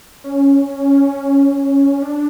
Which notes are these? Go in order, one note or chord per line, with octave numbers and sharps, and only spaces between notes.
C#4
D4